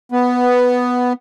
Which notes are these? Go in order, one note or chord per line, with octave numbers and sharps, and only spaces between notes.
B3